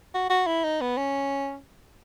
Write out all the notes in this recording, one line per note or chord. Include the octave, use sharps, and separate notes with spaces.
F#4
F#4
E4
D#4
B3
C#4